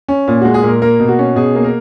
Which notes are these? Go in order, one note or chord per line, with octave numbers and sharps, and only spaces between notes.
C#4
A#2
G#3 F#4
G#4
A#2 A#4
A#3 A#4
B2
F#4
C#4
B2 G#4
A#3
A#4